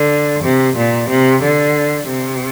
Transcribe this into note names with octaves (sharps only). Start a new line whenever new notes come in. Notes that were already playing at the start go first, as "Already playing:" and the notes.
Already playing: D3
C3
A#2
C3
D3
C3